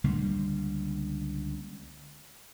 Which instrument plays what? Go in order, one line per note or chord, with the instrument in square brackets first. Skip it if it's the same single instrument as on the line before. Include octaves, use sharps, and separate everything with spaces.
[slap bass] C#2 D3 G3 A#3